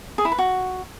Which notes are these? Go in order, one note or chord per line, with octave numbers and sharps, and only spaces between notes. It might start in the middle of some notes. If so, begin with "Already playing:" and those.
G#4
E4
B4
F#4